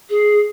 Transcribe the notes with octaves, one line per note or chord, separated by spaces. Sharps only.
G#4